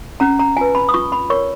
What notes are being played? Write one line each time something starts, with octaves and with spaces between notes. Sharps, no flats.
C#4 A#5
A#5
F4 B4 G#5
B5
D#6
F4 C#6
B5
A#4 C#5 C#6